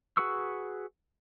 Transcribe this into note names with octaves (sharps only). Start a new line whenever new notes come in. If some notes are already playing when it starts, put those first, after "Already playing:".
F#4 G#4 B4 C#6 E6